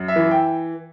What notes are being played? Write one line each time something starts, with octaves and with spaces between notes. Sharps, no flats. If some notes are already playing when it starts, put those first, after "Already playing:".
Already playing: F#2
E5
E3
G5